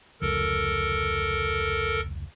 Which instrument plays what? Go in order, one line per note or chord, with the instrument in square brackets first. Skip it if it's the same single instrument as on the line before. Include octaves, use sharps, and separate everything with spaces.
[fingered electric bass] F1 C#2 [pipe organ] A4 A#4